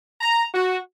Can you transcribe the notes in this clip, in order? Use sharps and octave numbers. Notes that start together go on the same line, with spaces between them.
A#5
F#4